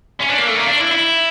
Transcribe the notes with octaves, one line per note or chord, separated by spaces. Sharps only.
C#4
D4
A#3
A3
A#3
D4
E4
E4